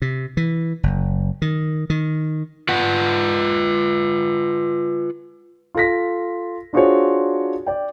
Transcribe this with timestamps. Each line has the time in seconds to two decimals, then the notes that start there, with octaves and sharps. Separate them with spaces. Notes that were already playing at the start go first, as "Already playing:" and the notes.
0.02 C3
0.37 E3
0.83 F#1
1.42 D#3
1.90 D#3
2.69 F4 B4 F#5
5.75 F4 A4 A#6 B6
6.73 D4 F4 F#4 G#4 C5 C#5
7.66 D5 G5